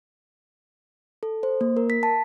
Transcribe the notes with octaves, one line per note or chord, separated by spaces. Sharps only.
A4
C5
A#3
A#4
B6
A5